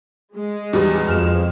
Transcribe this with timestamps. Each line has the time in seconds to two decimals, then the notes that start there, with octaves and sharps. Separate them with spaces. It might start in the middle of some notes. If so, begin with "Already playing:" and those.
0.36 G#3
0.73 E2 F#3 G3
1.08 F2 F6 E7